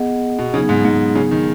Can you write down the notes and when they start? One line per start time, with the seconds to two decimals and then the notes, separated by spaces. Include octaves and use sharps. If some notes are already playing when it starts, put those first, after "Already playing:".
Already playing: B3 G#4 D#5 F#5
0.39 B2
0.54 C#3 F#3 B3 D#4 G#4
0.69 G#2
0.85 G#2
1.15 C#3
1.31 D#3